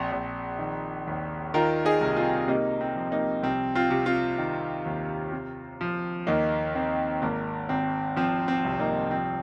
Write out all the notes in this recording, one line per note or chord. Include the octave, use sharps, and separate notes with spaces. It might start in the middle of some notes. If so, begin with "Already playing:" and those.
Already playing: A#1 C4
A#1
D#3
D#2
D#3 F4 A#4
D#4 G#4
C2
C4 F4
C3 A#3 D#4
C4
F3
A#3 D#4
C2 C4
C4 F4
C3
C4 F4
D#3
D#2
C3
F3
D#2 A#3 D#4
D#3 C4
G#1 A#3
G#1 C4
F3 C4
C4
C2
A#3 D#4
F3 C4